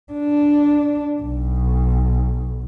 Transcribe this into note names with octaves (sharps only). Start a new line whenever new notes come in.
D4
B1